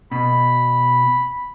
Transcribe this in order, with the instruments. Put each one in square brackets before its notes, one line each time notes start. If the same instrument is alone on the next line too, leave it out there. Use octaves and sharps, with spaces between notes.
[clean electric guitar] B2 [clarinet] B5